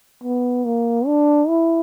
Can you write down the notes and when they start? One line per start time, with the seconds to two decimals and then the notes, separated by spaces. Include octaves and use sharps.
0.24 B3
0.65 A#3
1.07 D4
1.48 E4